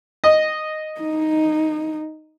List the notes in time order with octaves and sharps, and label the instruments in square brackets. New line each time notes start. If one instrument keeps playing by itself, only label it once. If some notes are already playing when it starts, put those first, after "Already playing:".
[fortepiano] D#5
[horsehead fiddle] D#4